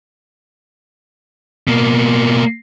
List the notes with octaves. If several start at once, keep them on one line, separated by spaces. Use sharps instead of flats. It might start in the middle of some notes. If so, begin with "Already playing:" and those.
B2 A#3